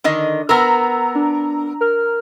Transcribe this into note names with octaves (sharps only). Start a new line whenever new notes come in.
D3 D#3 D#5
B3 A#4 A#5 E6
D4
A#4 F6